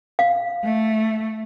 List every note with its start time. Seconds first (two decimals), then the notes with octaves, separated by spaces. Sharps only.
0.19 F5
0.64 A3